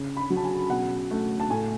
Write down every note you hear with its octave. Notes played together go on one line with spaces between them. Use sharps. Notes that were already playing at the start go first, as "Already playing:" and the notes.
Already playing: C#3
B5
F#3
A5
G#5
B2 F#5
A3
A5
A2 G#5